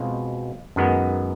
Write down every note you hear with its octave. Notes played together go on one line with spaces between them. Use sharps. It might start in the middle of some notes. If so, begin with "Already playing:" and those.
Already playing: B2 G#3 C4 F4
F#2 D#3 G#3 B3